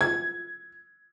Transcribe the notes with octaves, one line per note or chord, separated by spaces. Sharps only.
G#6